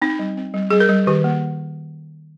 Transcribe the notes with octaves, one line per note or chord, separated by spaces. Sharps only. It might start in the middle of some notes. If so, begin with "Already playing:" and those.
C4 D#4
G3
C4
G3
G3 G#4
A#4
G3
D#3 G4
A#3